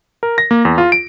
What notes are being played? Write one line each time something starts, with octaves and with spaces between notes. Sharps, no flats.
A#4
A#6
A#3
E2
F4
D7